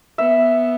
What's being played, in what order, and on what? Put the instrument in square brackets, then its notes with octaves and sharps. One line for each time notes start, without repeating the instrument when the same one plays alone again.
[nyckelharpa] B3 [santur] E5